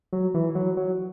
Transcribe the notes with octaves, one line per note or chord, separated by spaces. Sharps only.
F#3
E3
F#3
F#3